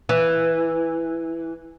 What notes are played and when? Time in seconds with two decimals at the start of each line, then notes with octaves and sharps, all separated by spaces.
0.09 E3